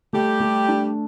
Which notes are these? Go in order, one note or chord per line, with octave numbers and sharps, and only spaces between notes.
G3 A3 G4
A3
D4